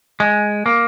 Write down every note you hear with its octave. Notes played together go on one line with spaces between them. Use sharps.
G#3
A#3